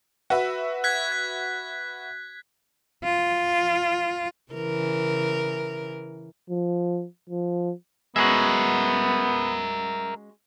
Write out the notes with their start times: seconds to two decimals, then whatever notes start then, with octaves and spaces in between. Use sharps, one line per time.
0.30 F#4 B4 E5
0.84 F#6 G#6 B6
1.12 G#6
3.04 F4
4.53 C#3 E3 A#4
6.50 F3
7.30 F3
8.16 G#3 B3 C#4 F#4 A#4 E5